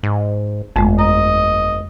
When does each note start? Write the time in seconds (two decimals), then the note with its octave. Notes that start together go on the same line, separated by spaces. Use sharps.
0.03 G#2
0.76 G1 F2 G#3 A3
0.99 D#5 A#5